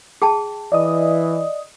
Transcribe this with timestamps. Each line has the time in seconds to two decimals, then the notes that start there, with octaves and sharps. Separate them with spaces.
0.22 G#4 G5 A5
0.72 E3 D5 D#5 D#6